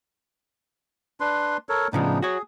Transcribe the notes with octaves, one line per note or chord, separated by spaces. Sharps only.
D4 B4 C6
A4 A#4 C#5
A2 C#3 F3 B3 D4 D#4
F#4 G#4 C#5